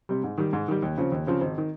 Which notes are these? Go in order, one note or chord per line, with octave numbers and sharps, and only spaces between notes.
C3 G3
G#2
D#3 G3
G#2
D#3 G3
D#2
C#3 F3 C4
D#2
C#3 F3 C4
G#1
D#3